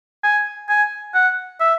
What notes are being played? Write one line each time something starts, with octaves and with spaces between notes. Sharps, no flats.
G#5
G#5
F#5
E5